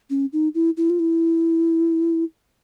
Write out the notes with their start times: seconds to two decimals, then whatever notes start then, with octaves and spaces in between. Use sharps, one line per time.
0.10 C#4
0.33 D#4
0.55 E4
0.77 E4
0.90 F4
0.99 E4